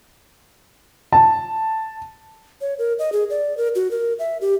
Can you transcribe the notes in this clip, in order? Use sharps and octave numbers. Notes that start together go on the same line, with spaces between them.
A5
C#5
A#4
D#5
G#4
D5
A#4
F#4
A#4
E5
G4